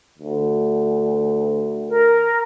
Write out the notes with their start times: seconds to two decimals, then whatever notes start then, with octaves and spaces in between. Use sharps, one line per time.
0.18 D2
1.89 A#4